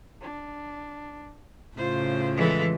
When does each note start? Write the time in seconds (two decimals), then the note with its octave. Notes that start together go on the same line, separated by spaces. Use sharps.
0.22 D4
1.77 A2 C#3 F4 C5
2.36 E3 G#3 A4